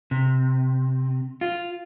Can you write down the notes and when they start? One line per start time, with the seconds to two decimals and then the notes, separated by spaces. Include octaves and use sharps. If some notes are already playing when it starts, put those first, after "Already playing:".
0.11 C3
1.41 F4